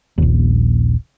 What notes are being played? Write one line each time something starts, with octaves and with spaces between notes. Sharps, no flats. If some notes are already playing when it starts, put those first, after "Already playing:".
D#1 A#1